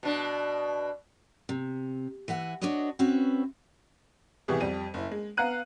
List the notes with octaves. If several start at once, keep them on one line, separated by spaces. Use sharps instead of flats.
B2 D4
C3
E3 E5 F#5 G#5
D4 F#4 B4 C#5 D#5
C4 C#4 F#4 B4 E5
C2 B2 E3 G4 G#4
F2 G3 D#7
F#1 E4
G#3
B3 F5 A#5 F#6 D#7